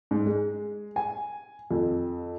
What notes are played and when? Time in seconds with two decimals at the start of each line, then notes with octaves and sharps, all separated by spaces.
0.11 G#2
0.26 G#3
0.96 G#5
1.71 F2